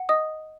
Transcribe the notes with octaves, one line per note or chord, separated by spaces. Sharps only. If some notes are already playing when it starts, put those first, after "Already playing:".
Already playing: F#5
D#5 D#6